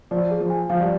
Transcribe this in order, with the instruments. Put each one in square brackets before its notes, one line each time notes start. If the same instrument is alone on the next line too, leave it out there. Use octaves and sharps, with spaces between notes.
[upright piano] F3 [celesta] D5
[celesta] G#4
[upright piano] F3
[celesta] G#5
[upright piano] F3 [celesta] F5
[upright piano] G3